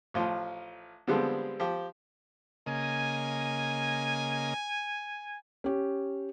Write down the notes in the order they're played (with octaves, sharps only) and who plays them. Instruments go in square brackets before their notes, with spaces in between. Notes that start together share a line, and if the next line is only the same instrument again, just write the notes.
[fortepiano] A1 F3 F4
D3 F3 G3 G#3 B3 C4
F3 G4
[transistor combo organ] C#3 A#3 D#5 [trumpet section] G#5
[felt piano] C#4 G4